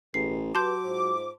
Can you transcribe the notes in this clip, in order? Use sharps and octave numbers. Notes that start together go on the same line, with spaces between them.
A1 B2 G#4 C7
F#3 F#4 G4 B4 A5 C6 D6 G6
G#2 F4 C5